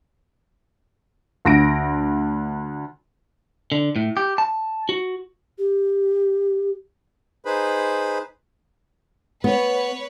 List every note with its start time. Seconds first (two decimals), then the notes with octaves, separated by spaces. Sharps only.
1.45 D2 A#6 D7
3.72 D3
3.96 A2
4.17 G4
4.38 A5
4.89 F#4
5.58 G4
7.45 D#4 G#4 B4 C5 B5
9.44 B3 B4 C#5